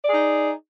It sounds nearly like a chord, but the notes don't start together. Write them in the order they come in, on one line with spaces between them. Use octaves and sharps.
D5 G#4 D#4